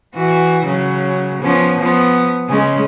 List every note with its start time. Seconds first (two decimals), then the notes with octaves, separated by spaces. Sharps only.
0.15 E3 F#4
0.66 C#3 F#3
1.41 F3 B3 C#4
1.79 F3 B3
2.49 C#3 G#3 C#4